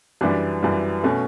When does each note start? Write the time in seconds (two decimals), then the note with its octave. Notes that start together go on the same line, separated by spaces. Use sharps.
0.21 F#2 E3 G3 D4
0.63 F#2 E3 G3
1.03 B2 A3 C#4